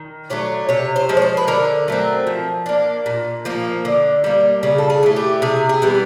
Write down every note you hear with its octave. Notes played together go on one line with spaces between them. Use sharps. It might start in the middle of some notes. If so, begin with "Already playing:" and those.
Already playing: D#3
F#3 A3 D4 C#5
C3 C#5
C5
F3 G#3
C#5
C5
B4
D3 A#4
F#3 A3 C4
F3
A#3 D4
A#2
F3 A#3
D3
G3 A#3
C#3 G#4
A4
G#4
E3 A3
G4
C3 G#4
G#4
E3 G3 B3